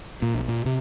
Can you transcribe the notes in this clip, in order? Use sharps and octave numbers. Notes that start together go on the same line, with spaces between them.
A#2
B1
A#2
C3